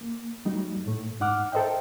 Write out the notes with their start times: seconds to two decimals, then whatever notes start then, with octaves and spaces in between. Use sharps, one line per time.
0.01 A#3
0.45 F#3 G3 A3 D#4
0.86 A2 A3
1.20 G#2 D#4 F#5 D6 F6
1.52 A4 A#4 C5 D#5 E5 G5